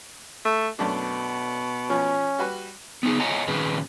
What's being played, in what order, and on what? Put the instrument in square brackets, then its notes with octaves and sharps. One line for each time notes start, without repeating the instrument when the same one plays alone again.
[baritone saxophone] A3
[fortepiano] F#2 A3 D4 [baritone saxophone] B2
[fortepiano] F3 [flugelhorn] C#4
[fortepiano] G3 F#4 B4
[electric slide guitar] B3 D#4 G#4
C#5 D#5 F#5 G#5 A#5
A#2 D#3 C#4 G#4 B4